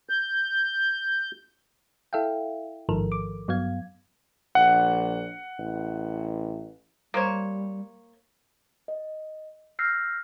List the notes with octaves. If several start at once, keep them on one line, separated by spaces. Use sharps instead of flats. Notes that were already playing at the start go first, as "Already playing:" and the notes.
G6
E4 A4 E5 F5 G5
A1 G#2 D#3 F3 A4 A#4
D6
G2 F#3 B3 F5 G#6
A#1 F#5
A1
G3 A#3 C5 C#5
D#5
E6 F6 G6 A#6 C7